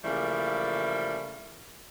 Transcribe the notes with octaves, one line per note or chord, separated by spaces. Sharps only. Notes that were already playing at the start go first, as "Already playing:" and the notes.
C#3 E3 F3 G3 A3 A#3